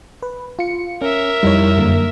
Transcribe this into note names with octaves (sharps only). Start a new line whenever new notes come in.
B4
F4 C#7
C#4 A#4 E5
F2 G3 D#4 E4 C#5
F#2 D3 A#3